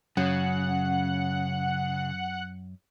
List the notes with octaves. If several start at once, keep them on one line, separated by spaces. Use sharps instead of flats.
F#2 C#3 F#5